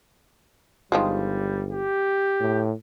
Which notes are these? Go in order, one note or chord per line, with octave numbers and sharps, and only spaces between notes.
G1 D#3 F3 G3 G#3
G4
A2